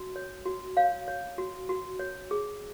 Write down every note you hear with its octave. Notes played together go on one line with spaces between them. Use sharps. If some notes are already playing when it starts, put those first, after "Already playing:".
Already playing: F#4
C#5
F#4
C#5 F5
C#5
F#4
F#4
C#5
G#4